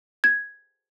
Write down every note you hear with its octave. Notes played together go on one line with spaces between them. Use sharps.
G#6